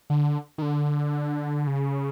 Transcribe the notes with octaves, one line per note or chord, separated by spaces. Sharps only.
D3
D#3
D3
C#3